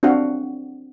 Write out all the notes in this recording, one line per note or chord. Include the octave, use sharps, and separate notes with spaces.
C4 D4 F#4 F5